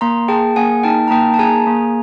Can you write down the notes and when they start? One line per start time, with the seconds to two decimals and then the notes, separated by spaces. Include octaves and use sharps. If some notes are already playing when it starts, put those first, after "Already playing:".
0.01 A#3 A#5 C6
0.28 G#4 G5 A5
0.56 A#3 F#5 G#5
0.83 D#4 G5 A5
1.08 A#5
1.11 A#3 G5 A5
1.34 A5
1.39 G#4 G#5 A#5
1.67 A#3